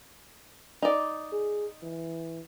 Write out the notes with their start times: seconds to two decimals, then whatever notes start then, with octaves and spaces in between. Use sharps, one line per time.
0.82 D#4 D5
1.33 G#4
1.83 E3